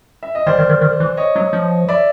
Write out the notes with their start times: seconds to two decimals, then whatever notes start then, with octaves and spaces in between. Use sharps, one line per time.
0.23 E5
0.35 D#5
0.47 D#3 C5 D5
0.59 D#3
0.69 D#3
0.81 D#3
1.00 E3
1.17 C#5 D#5
1.36 F#3
1.53 F3
1.88 D5 E5